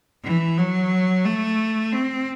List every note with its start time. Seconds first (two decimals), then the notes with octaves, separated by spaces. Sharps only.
0.24 E3
0.58 F#3
1.25 A3
1.92 C4